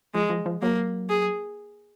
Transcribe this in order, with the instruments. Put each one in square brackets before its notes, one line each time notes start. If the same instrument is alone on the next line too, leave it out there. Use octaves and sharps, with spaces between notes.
[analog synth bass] F3 [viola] G#3
[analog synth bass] F3
F3
[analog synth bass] F#3 [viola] A#3
[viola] G#4